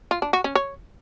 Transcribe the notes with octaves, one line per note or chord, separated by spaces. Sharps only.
F4
D4
F#4
C#4
C#5